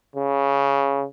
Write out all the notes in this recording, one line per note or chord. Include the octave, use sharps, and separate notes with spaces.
C#3